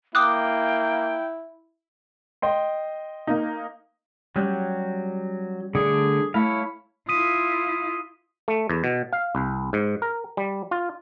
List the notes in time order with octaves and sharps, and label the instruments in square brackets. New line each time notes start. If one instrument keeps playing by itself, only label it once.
[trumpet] A#3 [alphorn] E4 [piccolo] G5 [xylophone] D6 D#6 F#6
[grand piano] D#5 G5 C6
[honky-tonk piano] A#3 D#4
[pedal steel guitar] F#3 F#6 G6 [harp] G3 C#4
[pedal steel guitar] D3 A3 D4 [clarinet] G#4
[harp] A3 [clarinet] E4 [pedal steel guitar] C#5 E5 F5
[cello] E4 F4 [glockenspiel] D#6 B6 D#7
[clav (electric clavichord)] A3
E2
B2
F5
C2
G#2
A#4
G3
F4